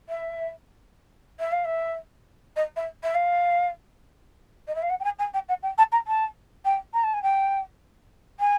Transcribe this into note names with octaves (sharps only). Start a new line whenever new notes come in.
E5
E5
F5
E5
D#5
E5
E5
F5
D#5
E5
F5
F#5
G5
G#5
G#5
G5
F#5
G5
A5
A#5
A5
G5
A#5
A5
G#5
G5
G#5